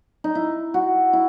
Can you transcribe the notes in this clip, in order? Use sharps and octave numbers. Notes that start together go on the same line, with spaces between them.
D#4
E4
F#4
E4